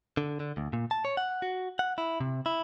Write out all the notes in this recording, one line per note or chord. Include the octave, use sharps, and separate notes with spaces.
D3
D3
D2
A#2
A5
C#5
F#5
F#4
F#5
E4
C3
E4